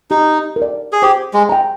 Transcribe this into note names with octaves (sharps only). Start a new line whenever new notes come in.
D#4 G4
A#4
D5
G#4
G4 C5
G#3
G5 A#5